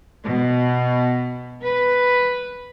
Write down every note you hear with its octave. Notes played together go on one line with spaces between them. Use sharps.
B2
B4